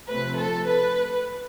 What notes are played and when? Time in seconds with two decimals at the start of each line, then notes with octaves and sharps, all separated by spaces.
0.10 C3 F3 A3 C4 B4
0.39 A4
0.67 B4